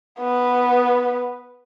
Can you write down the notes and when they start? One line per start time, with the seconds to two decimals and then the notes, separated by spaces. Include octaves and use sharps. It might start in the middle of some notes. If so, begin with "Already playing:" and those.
0.20 B3 B4